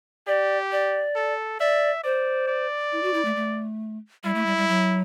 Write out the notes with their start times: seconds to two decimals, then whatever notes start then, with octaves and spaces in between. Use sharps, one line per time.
0.27 G4 D5
0.72 D5
1.15 A4
1.60 D5 E5
2.03 C5 D5
2.47 D5
2.92 E4
3.03 F#4
3.14 E4
3.25 A3
3.36 A3
4.24 G3 E4
4.35 A3
4.46 G3
4.57 G3
4.69 F#3